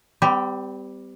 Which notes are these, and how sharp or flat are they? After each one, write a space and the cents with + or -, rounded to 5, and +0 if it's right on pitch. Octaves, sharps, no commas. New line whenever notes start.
G3 +0 C4 -45 G4 +0